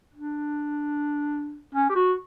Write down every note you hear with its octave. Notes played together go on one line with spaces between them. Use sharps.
D4
C#4
G4
F#4